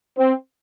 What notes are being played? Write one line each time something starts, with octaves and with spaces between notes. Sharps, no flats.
C4